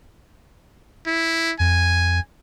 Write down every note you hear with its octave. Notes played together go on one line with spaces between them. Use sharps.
E4
F2 G#5